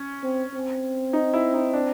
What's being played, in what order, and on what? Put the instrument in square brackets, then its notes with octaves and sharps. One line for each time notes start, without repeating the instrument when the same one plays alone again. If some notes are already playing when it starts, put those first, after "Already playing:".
Already playing: [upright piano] C#4
[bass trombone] C4
C4
[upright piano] D#4
E4
D#4
D4